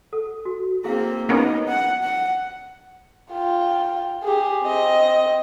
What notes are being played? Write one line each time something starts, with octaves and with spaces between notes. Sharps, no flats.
A4
F#4
A#3 C4 E4 G#4 F5
A#3 B3 C#4 D#4
F#5
F#5
F4 G5
G4 G#4
C4 D#5